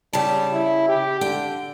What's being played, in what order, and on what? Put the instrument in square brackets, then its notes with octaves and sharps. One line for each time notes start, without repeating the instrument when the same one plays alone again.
[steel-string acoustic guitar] C#3 A5 [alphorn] G3
[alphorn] E4
G4
[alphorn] D3 [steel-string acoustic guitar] G5